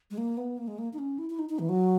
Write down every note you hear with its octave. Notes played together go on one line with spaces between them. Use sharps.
G#3
A#3
B3
A#3
G#3
A#3
D#4
C#4
E4
E4
D#4
D#4
E3
F#3